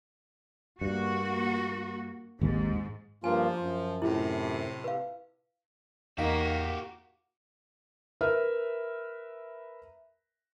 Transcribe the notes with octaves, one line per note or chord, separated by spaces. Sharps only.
G2 A#3 F#4
G#1 D#2 G#2
G2 F3 A#3 F4 G#5
F#2
A2 C3 E4 F4
B4 F5
E2 A#3 D#4 F#4 G4 F5 B6
A#4 B4 E5 F6